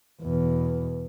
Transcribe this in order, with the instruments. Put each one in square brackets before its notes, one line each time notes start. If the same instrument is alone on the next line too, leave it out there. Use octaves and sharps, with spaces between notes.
[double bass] E2 B2